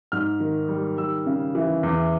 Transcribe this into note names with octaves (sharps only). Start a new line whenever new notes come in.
G#2 F6
D#3
G3
G3 E6
C#3
E3
E2